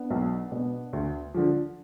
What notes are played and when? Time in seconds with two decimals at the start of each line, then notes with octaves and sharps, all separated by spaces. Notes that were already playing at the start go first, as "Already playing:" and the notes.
Already playing: B3 D4
0.11 B1
0.52 B2
0.93 D2
1.34 D3 F3